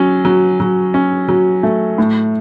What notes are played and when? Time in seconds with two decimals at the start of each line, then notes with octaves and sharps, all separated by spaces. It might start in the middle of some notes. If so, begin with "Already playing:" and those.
Already playing: F#3 C#4
0.25 F#3
0.60 F#3
0.94 C#4
1.29 F#3
1.63 A3
1.98 A2